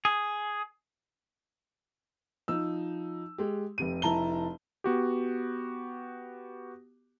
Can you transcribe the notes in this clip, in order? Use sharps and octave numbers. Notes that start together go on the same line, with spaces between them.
G#4
F3 D#4 E6
G#3 G4
F1 C3 D#7
F1 E4 A5 A#5 G7
B3 F#4 G4